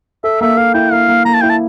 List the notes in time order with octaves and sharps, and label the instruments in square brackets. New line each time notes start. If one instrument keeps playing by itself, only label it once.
[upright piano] A4 [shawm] E5
[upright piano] A#3 [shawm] E5
[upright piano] A4 [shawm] F5
[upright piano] E4 [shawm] G5
[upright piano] A#3 [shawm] F5
[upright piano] A#3
[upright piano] A#3 [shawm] A#5
[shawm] A5
[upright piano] E4 [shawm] G5
[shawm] A5